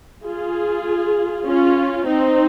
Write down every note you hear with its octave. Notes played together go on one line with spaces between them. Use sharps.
F4 G#4
C#4 F4
C4 D#4